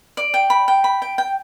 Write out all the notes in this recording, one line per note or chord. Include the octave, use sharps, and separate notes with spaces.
D5
G5
B5
G5
B5
G5
G5